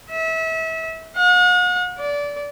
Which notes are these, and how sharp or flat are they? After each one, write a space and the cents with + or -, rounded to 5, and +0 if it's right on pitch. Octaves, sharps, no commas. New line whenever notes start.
E5 -30
F#5 -45
D5 -20